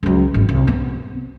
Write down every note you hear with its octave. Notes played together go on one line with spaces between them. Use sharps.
C#2 F#3
G#1 D#3
C2
B3 C4